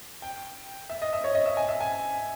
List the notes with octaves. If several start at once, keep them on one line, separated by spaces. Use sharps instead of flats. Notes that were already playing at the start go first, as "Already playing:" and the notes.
G5
E5
D#5
E5
C#5
D#5
E5
G#5
E5
G#5